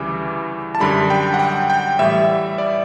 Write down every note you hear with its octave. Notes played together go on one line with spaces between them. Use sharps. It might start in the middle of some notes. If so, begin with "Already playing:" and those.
Already playing: D2 C#3 E3 G3 D6
A5
F#2 D3 G3 B5
G5
F#5
G5
G5
A2 E3 G3 E5
D5